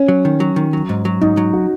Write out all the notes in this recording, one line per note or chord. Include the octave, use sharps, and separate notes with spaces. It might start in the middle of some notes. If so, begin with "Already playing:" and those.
Already playing: C#4
F#3
D#3
F#3
D#3
F#3
G#2
F#3
G#2 D#4
F#3
F#4